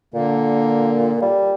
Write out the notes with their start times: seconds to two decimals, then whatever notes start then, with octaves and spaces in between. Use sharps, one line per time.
0.14 A#2 D3 A#3
1.22 G3